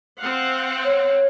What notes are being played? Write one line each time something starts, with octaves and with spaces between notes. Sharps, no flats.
C4 F5 F#5
C#5